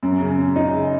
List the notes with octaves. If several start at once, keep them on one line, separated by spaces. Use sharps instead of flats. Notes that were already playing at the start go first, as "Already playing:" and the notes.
F#2
C#3
C#3
D#4
C#3